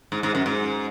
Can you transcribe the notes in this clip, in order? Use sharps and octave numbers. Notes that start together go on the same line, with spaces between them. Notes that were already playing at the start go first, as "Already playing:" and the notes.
G#2
G#2
F#2
G#2